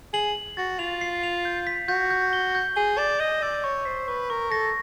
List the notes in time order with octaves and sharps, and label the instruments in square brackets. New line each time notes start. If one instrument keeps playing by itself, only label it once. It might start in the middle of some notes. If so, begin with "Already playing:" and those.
[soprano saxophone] G#4 [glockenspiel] F#7
[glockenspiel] F#7
[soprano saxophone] F#4 [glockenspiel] A6
[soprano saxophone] F4 [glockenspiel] F7
[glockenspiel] C7
F7
G6
B6
[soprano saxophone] F#4 [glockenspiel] G6
[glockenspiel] G6
G7
G6
[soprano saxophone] G#4 [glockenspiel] G7
[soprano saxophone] D5 [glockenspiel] E7
[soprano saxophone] D#5 [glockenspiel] G6
[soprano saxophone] D5 [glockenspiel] E6
[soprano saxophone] C#5 [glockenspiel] C#6
[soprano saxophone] C5 [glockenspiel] B6
[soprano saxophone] B4 [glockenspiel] C#6
[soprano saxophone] A#4 [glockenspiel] C#6
[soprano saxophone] A4 [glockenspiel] A#6